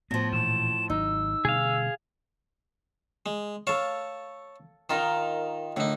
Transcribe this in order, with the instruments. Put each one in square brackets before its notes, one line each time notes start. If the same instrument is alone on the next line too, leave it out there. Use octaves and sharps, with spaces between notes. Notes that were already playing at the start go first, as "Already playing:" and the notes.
[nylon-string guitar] A2 F3 [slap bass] B3 [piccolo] A#6
[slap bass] A#2 E3 [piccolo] E7
[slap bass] G#1 F#3 [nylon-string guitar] D#4 [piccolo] E6
[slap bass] B2 D3 G3 [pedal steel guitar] G#4 F5
[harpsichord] G#3
[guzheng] A4 F5 [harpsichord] C#5 A5
[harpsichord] D#3 [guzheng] D#4 F4 A#4
[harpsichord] A2 D#4 [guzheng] D3